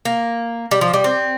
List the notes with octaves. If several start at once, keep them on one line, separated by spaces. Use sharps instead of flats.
A#3
G3
F3
G3
C4